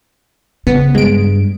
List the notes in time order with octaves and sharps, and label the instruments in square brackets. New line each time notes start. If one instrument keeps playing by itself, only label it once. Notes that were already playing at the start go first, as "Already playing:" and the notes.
[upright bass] C#3 [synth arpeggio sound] B3
[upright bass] G2 [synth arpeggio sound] G#3 D7